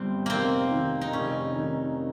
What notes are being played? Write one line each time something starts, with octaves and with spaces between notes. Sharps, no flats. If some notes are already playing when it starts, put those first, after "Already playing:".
Already playing: G1 G3 C4
F1 A#3 C4
D#3
D#4
F1 C#4
D#3